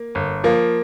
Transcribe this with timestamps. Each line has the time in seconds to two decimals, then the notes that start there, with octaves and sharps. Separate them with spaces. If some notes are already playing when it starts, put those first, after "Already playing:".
Already playing: A#3
0.15 G1
0.44 F3 A#3